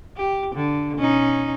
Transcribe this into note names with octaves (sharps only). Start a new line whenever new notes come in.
G4
D3
B2 C#4 D#4